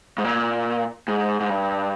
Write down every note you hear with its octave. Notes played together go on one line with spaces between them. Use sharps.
G#2
A#2
G#2
G#2
G2